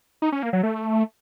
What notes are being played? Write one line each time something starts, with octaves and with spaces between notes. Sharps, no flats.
D#4
C#4
A#3
F#3
A3